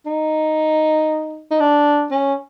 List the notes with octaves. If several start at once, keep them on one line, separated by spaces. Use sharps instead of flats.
D#4
D#4
D4
C#4